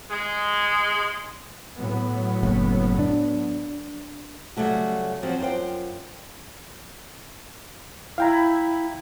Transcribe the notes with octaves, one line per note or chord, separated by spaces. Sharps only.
G#3
A2 F#3 B3
F#1
D4
C#3 F#3 G3 A3 F#4
F3 F#3 C4 F#4 G4
F#2 F4 C5 G5
E4 F5 G5 A#5